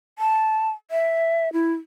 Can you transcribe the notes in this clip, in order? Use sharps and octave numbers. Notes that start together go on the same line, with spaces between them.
A5
E5
E4